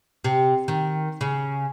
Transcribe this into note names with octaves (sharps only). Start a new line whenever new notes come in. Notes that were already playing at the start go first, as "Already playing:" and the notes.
C3
D#3
C#3